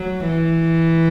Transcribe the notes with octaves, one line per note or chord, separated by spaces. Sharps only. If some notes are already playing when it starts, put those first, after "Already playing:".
Already playing: F#3
E3